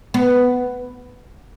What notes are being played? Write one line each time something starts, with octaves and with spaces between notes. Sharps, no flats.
B3